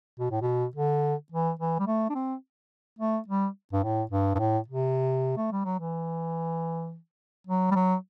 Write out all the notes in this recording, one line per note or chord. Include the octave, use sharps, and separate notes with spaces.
B2
A2
B2
D3
E3
E3
G3
A3
D4
C4
A3
G3
G2
A2
G2
G2
A2
C3
A3
G3
F#3
E3
F#3
G3
F#3